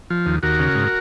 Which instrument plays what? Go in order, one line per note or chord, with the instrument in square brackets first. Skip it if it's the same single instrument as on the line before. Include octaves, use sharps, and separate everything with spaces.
[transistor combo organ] F3
D#2
D#2 F#4 A#4
C#3
G#2